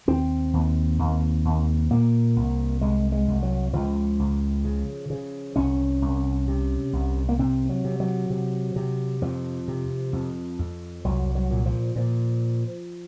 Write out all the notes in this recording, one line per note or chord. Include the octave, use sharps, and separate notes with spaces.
D#2 C4
D#2
D#2
D#2
A#2 A#3
C2
C2 G#3
G#3
C2
F#3
C#2 F3
C#2
C#3
C#3
C2 C#4
C2
C3
C2
A#3
C3 C4
F#3
C3
F#3
C3
C3
F2 F3
C3
F2
F2
C2 F#3
F#3
A#2
F3
A#2